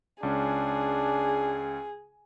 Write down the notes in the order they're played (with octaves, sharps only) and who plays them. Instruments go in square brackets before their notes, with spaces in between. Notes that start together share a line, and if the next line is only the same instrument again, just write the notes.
[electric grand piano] C#2 C#4 [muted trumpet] D4 [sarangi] G#4